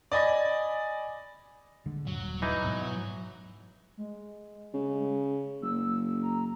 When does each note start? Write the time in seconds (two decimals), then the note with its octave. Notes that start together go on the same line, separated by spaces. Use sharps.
0.12 D5 D#5 G#5 B5 A#6
1.86 D3 G#3
2.07 D#1 G2 F#3
2.42 E3 F#3 D#4
2.64 G#2 B2
3.97 G#3
4.74 C#3
5.62 F#1 E6
6.22 A#5